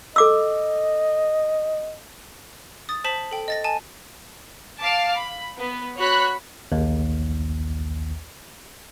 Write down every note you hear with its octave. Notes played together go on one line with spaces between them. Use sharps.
A4 D#5 D6 E6
D#6 A6
C5 A5 B6 F#7
A4 G5
D#5 A6 A#6
G#5 A5
F5 A5 D6
B5
B3
F#4 C#5 B5 C#6 F#6
A#1 D#2